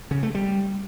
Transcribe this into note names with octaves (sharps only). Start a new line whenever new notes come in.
C#3
A3
G3